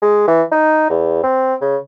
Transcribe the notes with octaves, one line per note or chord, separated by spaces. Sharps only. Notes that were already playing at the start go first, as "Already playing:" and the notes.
G#3
E3
D#4
E2
C4
C#3